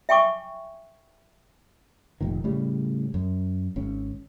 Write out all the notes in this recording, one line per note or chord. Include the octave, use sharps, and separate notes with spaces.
E5 G5 G#5 C#6 D6
F1 A#2 D#3
A2 C#3 G3
F#2
G#1 C#4